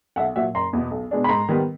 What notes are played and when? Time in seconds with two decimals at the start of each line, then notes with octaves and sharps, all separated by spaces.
0.16 B1 E5 F#5
0.36 A#2 F#3 E5 F#5
0.54 F#1 A#5 C6
0.73 E2 B2
0.91 B1
1.11 B2 G#3 B3 D4
1.24 B5
1.29 G#2 A#5 C6
1.49 D#3 G3 B3